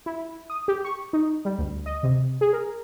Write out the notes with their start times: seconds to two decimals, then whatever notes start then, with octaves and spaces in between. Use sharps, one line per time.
0.06 E4
0.50 D#6
0.68 G4
0.85 C#6
1.13 D#4
1.45 G3
1.58 D2
1.86 D#5
2.03 C3
2.41 G#4
2.53 A#4